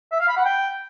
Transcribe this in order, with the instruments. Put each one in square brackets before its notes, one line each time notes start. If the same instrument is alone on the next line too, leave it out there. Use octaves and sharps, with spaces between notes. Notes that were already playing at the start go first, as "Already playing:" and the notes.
[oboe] E5
F5
B5
F#5
G5